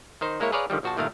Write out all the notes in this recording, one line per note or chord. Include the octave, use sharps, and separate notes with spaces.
D#3 D#4 C5
G#3 A#3 E4 A#4 C#5
G#4 B4 C#5 D5 F5 A#5
D3 D#3 F3 G3
A#1 F3 F#4 C5 A5
G1 A#2 D#3 A3 A#4 F5